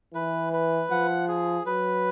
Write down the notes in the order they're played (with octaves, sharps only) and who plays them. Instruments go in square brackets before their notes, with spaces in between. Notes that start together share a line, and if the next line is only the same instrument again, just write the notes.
[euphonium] E3 [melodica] B4
[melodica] B4
[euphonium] F3 [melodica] F#5
[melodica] G#4
[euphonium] F#3 [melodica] B4